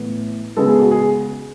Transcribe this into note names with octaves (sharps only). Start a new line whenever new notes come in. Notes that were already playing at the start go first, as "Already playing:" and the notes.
Already playing: A2 E3 B3
C#3 G#3 B3 A4
G#4
F#4
G#4